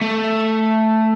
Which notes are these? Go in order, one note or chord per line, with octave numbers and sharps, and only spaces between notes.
A3